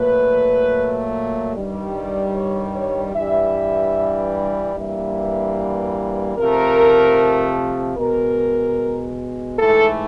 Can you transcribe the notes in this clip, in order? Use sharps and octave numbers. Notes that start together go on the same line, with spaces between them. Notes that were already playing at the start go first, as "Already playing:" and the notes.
Already playing: A#2 F#3 A3 B4
G2 D#3 G3
D5
C#5
C#5
G2 E3 G3 E5
G2 E3 G3 A#3 E5
C3 F3 A3 A#4
B2 G#3 A#4
G#2 E3 A3 A4